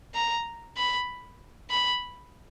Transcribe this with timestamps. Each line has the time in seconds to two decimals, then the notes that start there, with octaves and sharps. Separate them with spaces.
0.15 A#5
0.77 B5
1.70 B5